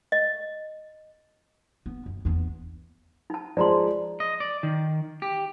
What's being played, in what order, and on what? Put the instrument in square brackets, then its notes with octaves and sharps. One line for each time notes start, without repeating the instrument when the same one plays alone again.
[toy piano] D#5
[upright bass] B3
F#2
E2 B3
[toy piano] D#4 A5
[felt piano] F3 G#3 [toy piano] D5 A#5 C6
[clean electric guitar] D#5
D5
D#3
G4